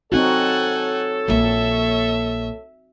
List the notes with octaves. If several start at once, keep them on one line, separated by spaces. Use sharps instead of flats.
C4 D#4 F#4 A4 C#5 F#5 G#5
A#1 A#3 E5